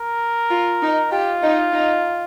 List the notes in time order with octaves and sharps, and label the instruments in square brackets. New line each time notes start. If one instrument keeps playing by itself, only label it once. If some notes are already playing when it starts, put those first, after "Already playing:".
Already playing: [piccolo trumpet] A#4
[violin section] F4
D#4
[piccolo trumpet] F4 [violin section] G4
[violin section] D#4
D#4